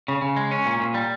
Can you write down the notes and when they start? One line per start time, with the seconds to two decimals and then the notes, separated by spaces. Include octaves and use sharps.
0.08 C#3
0.22 C#3
0.36 G#3
0.51 C#4
0.66 A#2
0.80 A#2
0.94 G3